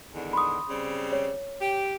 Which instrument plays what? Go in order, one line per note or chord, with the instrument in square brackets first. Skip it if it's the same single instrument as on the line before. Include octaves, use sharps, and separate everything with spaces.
[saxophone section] E2 D3 D#3
[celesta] B5 C6 D#6
[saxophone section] C#3 G3 C4
[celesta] C#5
[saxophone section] G4